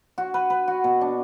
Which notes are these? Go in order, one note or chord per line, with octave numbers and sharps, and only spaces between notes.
F#4
B4
B4
F#4
B2
D4